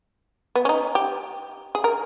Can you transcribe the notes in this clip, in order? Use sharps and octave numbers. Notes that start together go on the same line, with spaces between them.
B3
C#4
D#4
G4
G#4
A#4